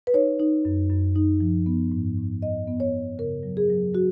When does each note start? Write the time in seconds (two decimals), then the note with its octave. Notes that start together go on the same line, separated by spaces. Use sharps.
0.07 B4
0.14 D#4 C#5
0.40 D#4
0.65 F#2
0.90 F#2
1.16 D#4
1.41 F3
1.66 B3
1.92 G#2
2.17 G#2
2.42 B3 D#5
2.67 B3
2.80 C#5
2.93 B3
3.18 C#3 A#4
3.43 F#3
3.57 G#4
3.70 F#3
3.94 F#3 F#4